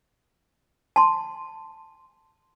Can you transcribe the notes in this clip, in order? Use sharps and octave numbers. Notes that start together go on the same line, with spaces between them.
A5 C6